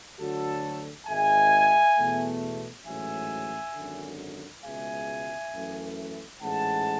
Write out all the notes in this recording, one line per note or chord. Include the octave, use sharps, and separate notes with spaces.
D2 D3 F#3 F#4 A4
G#1 G#2 G#3 E5 G#5
E2 B2 A3
A1 G#2 F#3 A3 E5 G#5
G#1 F#2 D3
C#2 B2 G#3 E5 G#5
F#2 E3 A3
A1 G#2 G#3 F#5 A5